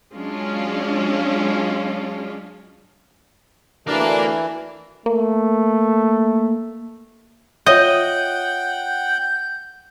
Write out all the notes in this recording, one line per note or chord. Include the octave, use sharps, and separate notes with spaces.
F#3 G#3 C#4 D4 F4
D2 E3 D4 A#4 F5
A3 A#3
F4 C#5 D#5 E5 F#5 G5 G6